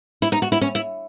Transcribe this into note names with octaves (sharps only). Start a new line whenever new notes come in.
E4
D#4
F#4
E4
C#4
E4